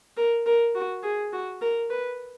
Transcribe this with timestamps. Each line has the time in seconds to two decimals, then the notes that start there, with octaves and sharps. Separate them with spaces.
0.17 A#4
0.46 A#4
0.75 F#4
1.03 G#4
1.33 F#4
1.61 A#4
1.90 B4